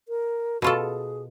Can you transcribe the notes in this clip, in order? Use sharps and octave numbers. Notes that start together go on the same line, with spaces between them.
A#4
B2 F4 F#4 A4
G#4